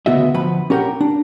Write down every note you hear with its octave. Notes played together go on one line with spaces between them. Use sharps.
D2 C#3 B3 F#4 D#5 E5
D2 F3 B4 F#5 B5
C#4 G4 A#4 F#5 G5
D4